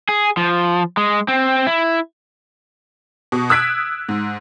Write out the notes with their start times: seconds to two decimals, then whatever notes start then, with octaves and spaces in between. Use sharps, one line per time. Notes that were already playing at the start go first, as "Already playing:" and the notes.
0.09 G#4
0.37 F3
0.97 G#3
1.28 C4
1.67 E4
3.32 B2
3.50 D#6 E6 F#6 G#6 B6 D7
4.09 G#2